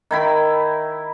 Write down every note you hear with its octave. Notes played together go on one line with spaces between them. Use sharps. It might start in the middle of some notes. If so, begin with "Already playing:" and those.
D#3 E4 B5